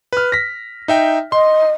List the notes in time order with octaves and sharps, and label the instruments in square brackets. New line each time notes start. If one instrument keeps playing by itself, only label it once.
[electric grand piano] B4 F6
A#6 B6
D#4 E5 G5
[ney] D#5 [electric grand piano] C6